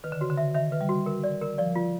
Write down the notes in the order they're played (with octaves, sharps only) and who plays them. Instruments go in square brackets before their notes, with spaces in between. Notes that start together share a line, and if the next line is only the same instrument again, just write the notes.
[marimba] D#3 [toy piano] B4
[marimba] D3
[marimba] C#3 [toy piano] F#4
[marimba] D3
[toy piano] E5
[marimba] D#3 [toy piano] E5
[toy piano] B4
[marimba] G3
[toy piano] F#4
A#4
D5
A#4
[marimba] F3 [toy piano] D5
[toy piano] F4